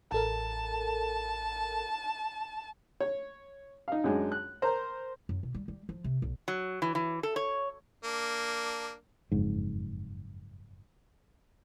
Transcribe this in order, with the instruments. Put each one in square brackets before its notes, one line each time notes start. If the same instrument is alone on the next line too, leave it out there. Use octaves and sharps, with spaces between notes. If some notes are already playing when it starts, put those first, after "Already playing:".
[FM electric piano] A1 A4 A#4 [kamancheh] A5
[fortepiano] C#5
D#4 F5
F#2 G#3 D4
F#6
A#4 C5 A#5
[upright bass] F#2
B2
G3
G3
F3
C3
B1
[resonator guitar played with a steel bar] F#3
E3
E3
A4
C#5
[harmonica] A#3 D4
[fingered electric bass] F#1 F2 G#2